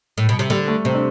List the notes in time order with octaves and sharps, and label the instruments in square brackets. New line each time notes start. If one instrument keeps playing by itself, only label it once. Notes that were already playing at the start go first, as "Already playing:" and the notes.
[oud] A2
B2
C3
[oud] D3 [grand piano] G3
[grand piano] A3
[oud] C3 [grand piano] C4
[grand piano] D4